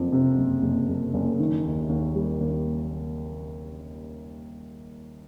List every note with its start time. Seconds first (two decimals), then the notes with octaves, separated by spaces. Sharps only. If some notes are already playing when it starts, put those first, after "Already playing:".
Already playing: F#1 F2
0.12 C3
0.38 F#1
0.62 F#1
0.89 F#1
1.14 F#1
1.39 D#3
1.65 D#2
1.89 D#2
2.15 G3
2.41 D#2